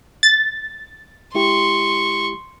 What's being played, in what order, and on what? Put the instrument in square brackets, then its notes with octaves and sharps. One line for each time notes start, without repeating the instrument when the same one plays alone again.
[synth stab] A6
[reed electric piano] G#3 E4 G4 [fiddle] C6 C#6